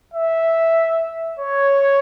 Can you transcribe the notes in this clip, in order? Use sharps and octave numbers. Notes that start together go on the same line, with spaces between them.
E5
C#5